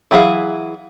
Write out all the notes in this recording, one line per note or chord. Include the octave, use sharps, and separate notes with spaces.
E3 F#3 E4 G#4 F5